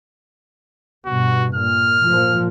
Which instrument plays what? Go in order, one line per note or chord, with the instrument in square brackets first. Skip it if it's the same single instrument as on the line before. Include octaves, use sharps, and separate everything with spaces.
[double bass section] G2 B2 [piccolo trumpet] F#4
[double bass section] A#2 [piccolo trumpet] F6
[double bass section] A#2 F3